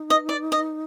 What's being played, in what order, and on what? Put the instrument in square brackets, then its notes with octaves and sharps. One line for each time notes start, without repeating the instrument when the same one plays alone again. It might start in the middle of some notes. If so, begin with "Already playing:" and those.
Already playing: [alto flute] D#4
[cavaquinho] D#5
D5
D#5